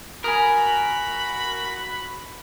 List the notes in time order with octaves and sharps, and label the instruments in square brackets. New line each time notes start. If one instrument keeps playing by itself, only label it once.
[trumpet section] F#4 B5 [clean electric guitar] A#4 [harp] G#5 D#6